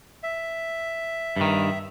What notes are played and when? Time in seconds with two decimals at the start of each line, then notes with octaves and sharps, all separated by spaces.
0.23 E5
1.37 G2 D#3